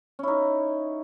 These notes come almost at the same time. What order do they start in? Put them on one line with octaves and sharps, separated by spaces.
C#4 E4 D#4